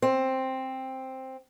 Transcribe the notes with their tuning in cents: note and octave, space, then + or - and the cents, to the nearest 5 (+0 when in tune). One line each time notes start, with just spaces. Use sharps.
C4 +5